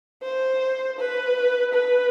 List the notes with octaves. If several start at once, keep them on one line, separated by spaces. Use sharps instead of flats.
C5
B4
B4